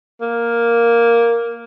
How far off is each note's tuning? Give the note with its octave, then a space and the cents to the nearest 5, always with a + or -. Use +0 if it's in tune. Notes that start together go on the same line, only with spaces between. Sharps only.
A#3 +0